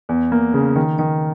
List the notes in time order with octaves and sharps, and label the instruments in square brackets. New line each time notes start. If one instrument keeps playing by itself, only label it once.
[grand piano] E2
A#3
C#3
D#3
D#3